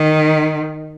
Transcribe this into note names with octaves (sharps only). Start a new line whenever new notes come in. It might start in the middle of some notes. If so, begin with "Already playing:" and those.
Already playing: D#3